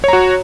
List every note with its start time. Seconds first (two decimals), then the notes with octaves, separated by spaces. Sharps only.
0.04 C#5
0.08 A#5
0.13 F#4